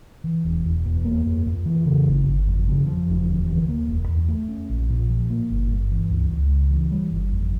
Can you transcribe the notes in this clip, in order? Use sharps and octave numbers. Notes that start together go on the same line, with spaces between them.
E3
E1
E1
E2
A#3
F2
F2
E3
C#3
G1
G1
F2
C#3
F3
E1
D2
E3
A#3
E1
E2
A3
C#4
A#1
A#2
F3
A#3
G1
G2
E3
C#2
C#2
C#3
E3
G3
G1
F2